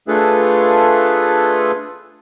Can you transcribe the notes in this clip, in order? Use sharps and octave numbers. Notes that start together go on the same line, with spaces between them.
A3 D4 F4 G#4 A4 B4